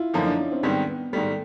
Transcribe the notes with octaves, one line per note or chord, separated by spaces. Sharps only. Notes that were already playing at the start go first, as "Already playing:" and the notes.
Already playing: E4 F4
F#2 D3 F3 A#3 D#4
D4
C#4
C4
G#2 D#3 G3 B3 C4
B3
G#2 D#3 G3 A3